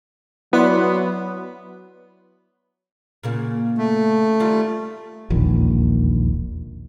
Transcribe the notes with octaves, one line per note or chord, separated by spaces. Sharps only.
F#3 B3 E4 D5 C6
A#2 C#3 A#3
A3
D#3 G3 F4
E1 A#1 D#2 A#2